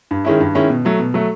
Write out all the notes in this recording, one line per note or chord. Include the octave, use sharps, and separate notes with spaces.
G2
D#3 G#3 C#4 E4
G2
D#3 G#3 C#4 E4
B2
F#3 A3
B2
F#3 A3